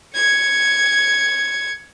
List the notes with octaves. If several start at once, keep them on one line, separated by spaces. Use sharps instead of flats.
G#6 C#7